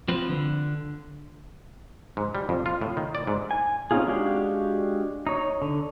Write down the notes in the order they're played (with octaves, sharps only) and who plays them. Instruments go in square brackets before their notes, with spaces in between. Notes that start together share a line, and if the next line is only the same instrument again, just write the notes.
[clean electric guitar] F3 C4 F4 B4
D3
[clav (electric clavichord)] G#2
G3
F2
F4
A2
D#3
D5
G#2
[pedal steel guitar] G#5
C4 C#4 D#4 F4 G#4
G#3 D4 F#4 G4 F5
D#4 C#5
D3